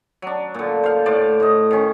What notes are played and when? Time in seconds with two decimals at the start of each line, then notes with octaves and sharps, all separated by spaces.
0.22 F#3 D4
0.54 A#2 D3
0.84 C5 F5
1.06 A2 C5 D5
1.40 A2 D#5
1.71 D#3 C#4